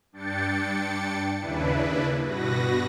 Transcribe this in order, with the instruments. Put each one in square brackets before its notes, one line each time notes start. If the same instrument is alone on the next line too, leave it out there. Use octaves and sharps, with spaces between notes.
[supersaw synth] G2 D4 G5 A6 C#7
D#2 C#3 D4 E4 B4
G2 B2 F#4 B4 A#6